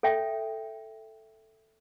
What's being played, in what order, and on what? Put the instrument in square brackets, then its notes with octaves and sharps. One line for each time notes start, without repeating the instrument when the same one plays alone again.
[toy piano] A4 C#5 E5 G5